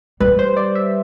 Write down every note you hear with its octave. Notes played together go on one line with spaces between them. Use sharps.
G3 B4
C5
D5
E5